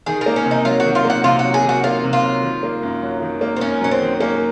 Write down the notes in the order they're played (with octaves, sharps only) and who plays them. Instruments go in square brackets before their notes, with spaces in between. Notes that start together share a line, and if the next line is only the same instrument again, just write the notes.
[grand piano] D#3 [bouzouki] G#4
[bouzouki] A#4
[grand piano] A#3
[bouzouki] C#4
[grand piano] C3
[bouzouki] D#4
[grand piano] F#3 [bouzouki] F4
[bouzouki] F#4
[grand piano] D#3
[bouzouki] F4
[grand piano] A#3 [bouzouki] F#4
[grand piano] C3 [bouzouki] F4
[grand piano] F#3 [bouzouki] F#4
[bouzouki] G#4
[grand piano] D#3 [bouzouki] F#4
[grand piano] A#3 [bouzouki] F4
[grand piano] C3
[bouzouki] F4
[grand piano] F#3
D#3
A#3
F#2
F#3
D#3
A#3
[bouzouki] C4
[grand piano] F#2 [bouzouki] C#4
[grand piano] F#3 [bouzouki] C#4
[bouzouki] C4
[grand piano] D#3
[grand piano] A#3 [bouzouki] C#4